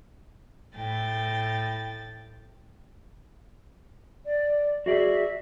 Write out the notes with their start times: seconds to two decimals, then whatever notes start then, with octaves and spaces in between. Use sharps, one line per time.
0.76 A2 G5 A6
4.25 D5
4.86 F#4 G#4 D5 E5